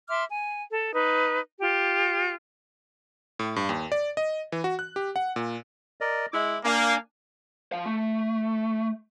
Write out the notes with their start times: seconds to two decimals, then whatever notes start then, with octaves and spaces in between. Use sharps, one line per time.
0.09 E5 C6 D6 F6
0.29 G#5
0.70 A4
0.93 D#4 B4
1.60 F4 G4
3.39 A2
3.56 G2
3.69 D#2
3.92 D5
4.17 D#5
4.52 E3
4.64 F#4
4.79 F#6
4.96 G4
5.16 F#5
5.36 A#2
6.01 A#4 D5 D#5
6.32 G#3 E4 D6
6.65 A#3 D4 A#4 F5 G#5
7.72 F3 F5
7.86 A3